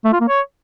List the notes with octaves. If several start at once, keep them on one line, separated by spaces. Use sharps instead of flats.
A3
F4
A#3
C#5